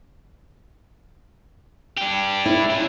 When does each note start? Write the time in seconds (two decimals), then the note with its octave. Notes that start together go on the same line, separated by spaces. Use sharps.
1.97 D4 G4
2.46 E4
2.70 C#3 C6